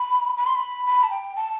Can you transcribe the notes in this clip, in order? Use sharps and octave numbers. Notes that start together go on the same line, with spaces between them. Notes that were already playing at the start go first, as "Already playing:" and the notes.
Already playing: B5
B5
C6
B5
B5
A5
G5
A5